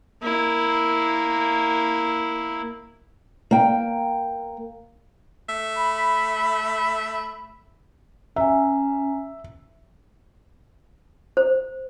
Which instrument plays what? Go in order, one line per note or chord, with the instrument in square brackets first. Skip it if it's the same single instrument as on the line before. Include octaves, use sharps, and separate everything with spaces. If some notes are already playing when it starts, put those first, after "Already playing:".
[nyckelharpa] A#3 E4
[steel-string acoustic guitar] A#3 G5
[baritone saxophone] A3
[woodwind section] B5
[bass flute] C#4 [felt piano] E5 [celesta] G#5 A#5
[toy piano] C5